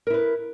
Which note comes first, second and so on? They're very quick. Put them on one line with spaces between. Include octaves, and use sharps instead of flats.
A#4 E4 B4